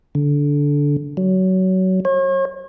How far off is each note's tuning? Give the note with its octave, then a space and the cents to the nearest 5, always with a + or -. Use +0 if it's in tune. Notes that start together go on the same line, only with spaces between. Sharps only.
D3 -15
F#3 +20
C#5 -40